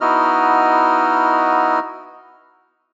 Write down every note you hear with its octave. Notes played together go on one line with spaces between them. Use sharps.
B3 D#4 E4 F#4 D#5 F6